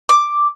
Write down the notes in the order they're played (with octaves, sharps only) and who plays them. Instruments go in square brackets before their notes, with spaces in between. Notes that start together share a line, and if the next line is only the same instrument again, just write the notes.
[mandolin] D6